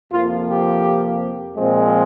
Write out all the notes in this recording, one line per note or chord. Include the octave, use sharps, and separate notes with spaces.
F2 C3 F3 A#3 F4
G4
A#2 F3 G#3 C4